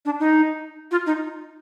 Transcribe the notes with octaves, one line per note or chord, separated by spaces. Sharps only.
D4
D#4
F4
D#4